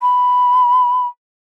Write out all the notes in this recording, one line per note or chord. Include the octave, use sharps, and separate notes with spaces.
B5